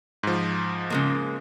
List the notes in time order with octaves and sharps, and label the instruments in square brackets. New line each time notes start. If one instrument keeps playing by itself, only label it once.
[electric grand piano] G#2 F3
[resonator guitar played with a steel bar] C#3 G#3 A#3